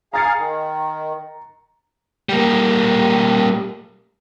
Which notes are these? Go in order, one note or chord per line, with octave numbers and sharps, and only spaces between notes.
G#4 F5 A#5 A6 C#7
D#3
G3 A#3